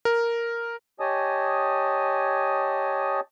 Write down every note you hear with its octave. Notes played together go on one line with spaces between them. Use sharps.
A#4
G4 C#5 D#5 G#5 A5 D#6